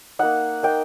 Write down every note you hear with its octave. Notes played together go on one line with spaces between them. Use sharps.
A#3 D#4 F#5
A#3 D#4 G5